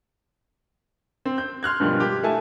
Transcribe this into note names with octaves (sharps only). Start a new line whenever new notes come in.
C4
G6
C6 F6 F#6 G#6
G2 B2 D#3 F3 G3 G#3
G4
A3 E4 G#5 A5